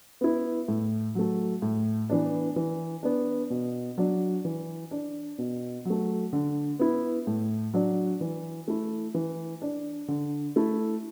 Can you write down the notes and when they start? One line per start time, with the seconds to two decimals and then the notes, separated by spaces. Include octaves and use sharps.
0.21 B3 E4
0.68 A2
1.15 F#3 A3
1.62 A2
2.10 E3 B3 D4
2.56 E3
3.03 B3 D4
3.50 B2
3.98 F#3 D4
4.45 E3
4.91 D4
5.38 B2
5.85 F#3 A3
6.33 D3
6.79 B3 E4
7.27 A2
7.74 F#3 D4
8.21 E3
8.68 A3 E4
9.14 E3
9.62 D4
10.08 D3
10.56 A3 E4